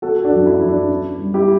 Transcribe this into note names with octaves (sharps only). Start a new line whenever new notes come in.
B3 F#4 A4
D4 F#4
F#2
E4
F#2
D4
B3
G3
E4 G4